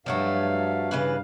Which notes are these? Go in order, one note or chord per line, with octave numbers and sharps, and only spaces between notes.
G2 F3 F#3 A3 F5
C#3 E3 B4